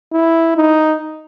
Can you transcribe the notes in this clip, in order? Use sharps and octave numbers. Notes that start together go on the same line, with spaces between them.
E4
D#4